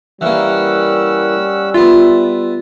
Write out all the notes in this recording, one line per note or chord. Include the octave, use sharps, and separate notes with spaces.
E3 G3 A#3 C#4 F#5 E6
B3 F4 E5